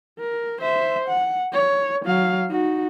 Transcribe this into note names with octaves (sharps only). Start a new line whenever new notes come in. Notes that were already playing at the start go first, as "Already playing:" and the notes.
A#4
C5 E5
F#5
C#5
F#3 F5
D#4 F#4